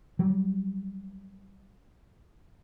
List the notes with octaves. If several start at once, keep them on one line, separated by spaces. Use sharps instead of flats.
F#3 G3